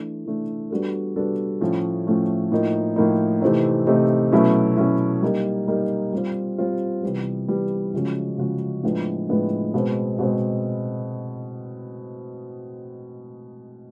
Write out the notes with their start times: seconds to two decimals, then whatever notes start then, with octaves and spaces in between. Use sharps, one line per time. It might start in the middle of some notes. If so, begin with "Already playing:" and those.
Already playing: E3 A3 D4
0.26 E3 A3 D4
0.70 G3 B3 D4 F#4 A4
1.16 G3 B3 D4 F#4 A4
1.61 A2 F3 A3 C#4
2.07 A2 F3 A3 C#4
2.52 A2 F3 A#3 D#4
2.96 A2 F3 A#3 D#4
3.41 C3 E3 A3 C4 D#4
3.87 C3 E3 A3 C4 D#4
4.32 B2 F#3 A3 C#4 E4
4.77 B2 F#3 A3 C#4 E4
5.22 G3 A#3 D#4 G4
5.68 G3 A#3 D#4 G4
6.13 G3 C4 F4
6.58 G3 C4 F4
7.03 C3 E3 G3 B3
7.48 C3 E3 G3 B3
7.94 C#3 F3 G#3 C#4 F#4
8.38 C#3 F3 G#3 C#4 F#4
8.83 A2 F3 G#3 B3 D4
9.29 A2 F3 G#3 B3 D4
9.74 B2 G#3 C4
10.19 B2 G#3 C4